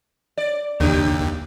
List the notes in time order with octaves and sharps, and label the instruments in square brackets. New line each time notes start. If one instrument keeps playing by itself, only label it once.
[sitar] D5
[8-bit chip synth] D#2 [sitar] C#3 G4